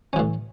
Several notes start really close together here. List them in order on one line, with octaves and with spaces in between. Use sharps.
C#4 E3 A2